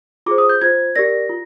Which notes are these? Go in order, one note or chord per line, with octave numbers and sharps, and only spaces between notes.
F4 G#4 C5 D6
D#6
G6
F4 C5 G#6
G4 A#4 D5 A#6
F4